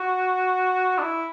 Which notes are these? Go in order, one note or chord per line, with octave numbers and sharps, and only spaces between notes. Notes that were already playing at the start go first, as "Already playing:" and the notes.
Already playing: F#4
D4
E4